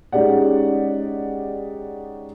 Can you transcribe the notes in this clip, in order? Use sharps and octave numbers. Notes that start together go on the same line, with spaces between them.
G#3 C#4 D#4 G4 D5 F#5